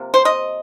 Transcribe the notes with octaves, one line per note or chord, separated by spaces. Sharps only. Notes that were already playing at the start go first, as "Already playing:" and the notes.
Already playing: C3 F3 A#3
C5
D#5